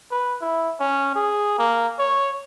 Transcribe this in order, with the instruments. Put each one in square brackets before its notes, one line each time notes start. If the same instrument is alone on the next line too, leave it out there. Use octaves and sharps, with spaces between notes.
[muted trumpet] B4
E4
C#4
G#4
A#3
C#5